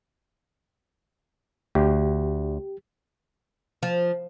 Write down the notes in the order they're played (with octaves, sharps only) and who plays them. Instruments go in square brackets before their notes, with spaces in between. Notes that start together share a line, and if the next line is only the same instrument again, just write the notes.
[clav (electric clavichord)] D2 [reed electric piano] G4
[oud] F3